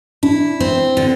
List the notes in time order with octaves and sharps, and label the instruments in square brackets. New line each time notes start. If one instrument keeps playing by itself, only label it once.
[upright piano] D4 [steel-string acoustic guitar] E4
[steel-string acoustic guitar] C4
D3